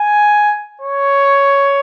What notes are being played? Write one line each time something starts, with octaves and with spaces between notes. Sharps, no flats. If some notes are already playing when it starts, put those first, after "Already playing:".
Already playing: G#5
C#5